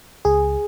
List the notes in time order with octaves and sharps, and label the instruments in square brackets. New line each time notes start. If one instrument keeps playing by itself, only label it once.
[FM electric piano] C#2 G#4